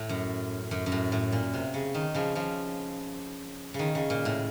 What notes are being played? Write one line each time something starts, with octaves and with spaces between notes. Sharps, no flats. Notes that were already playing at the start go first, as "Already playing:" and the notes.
Already playing: A2
F#2
F#2
F#2
A2
A2
A#2
C3
C#3
D#3
C#3 F3
C#3 F3
C#3
D#3
C#3
A#2
A2